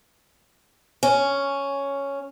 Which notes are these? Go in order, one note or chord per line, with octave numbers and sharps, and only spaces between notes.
C#4